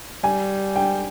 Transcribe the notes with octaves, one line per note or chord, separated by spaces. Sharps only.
G3 G#5
G5